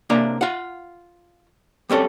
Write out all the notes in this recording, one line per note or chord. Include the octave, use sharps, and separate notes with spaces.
C3 A#3 D4 A#5
F4 F#5
G3 C4 C#4 A4